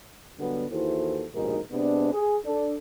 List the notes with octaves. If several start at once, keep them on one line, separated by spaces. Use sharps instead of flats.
D3 F#3 G3 B3
D#2 E3 E4 F#4 A4 C5
A#1 D#2 G#2 B2 D#4 A#4
C3 G#3 B3 D4
G#4
D4 A4